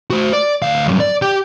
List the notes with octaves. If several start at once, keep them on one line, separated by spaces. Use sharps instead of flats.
F#4 C5
D5
D2 F5
G2 F#3
D5
G4 G5